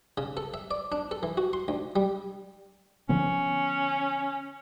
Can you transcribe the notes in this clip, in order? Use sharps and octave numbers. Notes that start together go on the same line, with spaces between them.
C#3
A4
E5
D5
D4
A4
E3
F#4
C6
D2
G3
D3 F3 B3 C#4